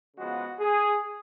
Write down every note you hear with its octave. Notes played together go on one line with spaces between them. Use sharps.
C#3 F3 G#3 B3 F#4
G#4